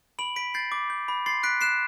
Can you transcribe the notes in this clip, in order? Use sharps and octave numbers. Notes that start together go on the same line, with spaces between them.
B5 D7 F#7
B5 B6 D7
G6 A6 C7
D6
G6
B5
C6 A6 C7
F#6 B6 D7
F#6 C7 E7